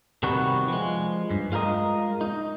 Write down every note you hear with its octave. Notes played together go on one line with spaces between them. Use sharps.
C3 D#3 G3 B3 F#4
F3 G#3
G2
G#3 F4 G4 A#4 D#5
D#4